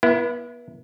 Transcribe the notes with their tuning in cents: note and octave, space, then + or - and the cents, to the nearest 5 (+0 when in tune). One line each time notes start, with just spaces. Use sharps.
B3 -35 E4 +15